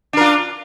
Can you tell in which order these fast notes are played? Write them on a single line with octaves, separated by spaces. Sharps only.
D4 A#4 F4